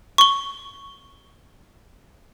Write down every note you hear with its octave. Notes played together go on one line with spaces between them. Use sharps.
C#6 G7